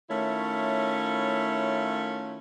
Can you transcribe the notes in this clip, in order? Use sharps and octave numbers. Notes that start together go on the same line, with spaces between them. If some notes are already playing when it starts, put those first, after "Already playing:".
D#3 A3 C#4 E4 F4 C#5